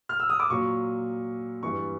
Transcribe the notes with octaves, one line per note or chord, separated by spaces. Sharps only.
F6
E6
D#6
D6
A#2 F#3 C#6
G2 E3 G3 C#6